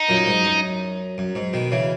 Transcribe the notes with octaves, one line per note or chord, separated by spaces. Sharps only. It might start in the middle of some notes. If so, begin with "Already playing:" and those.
Already playing: D#4
F#2 A#2
G#2
F#2
F#2
G#2
B2 D#3
C#3 E3